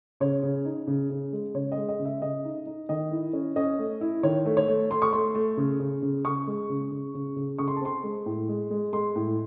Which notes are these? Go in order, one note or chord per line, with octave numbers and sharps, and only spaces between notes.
C#3 C#5
C#3
D#4
C#3
C#3
G#3
C#3 C#5
D#5
G#3
D#5
C#3
E5
C#3 D#5
D#4
D#4
D#3 D#5
E4
C#4
C#4 D#5
A3
E4
D#3 C#5
A3
C#5
A3
A3 C6
C#6
A3 C6
A3
C#3
C#3
C#3
C#3 C#6
G#3
C#3
C#3
C#3
C#3
C#3 C#6
C6
A5
C4 C6
G#3
A2
G#3
G#3
G#3 C6
A2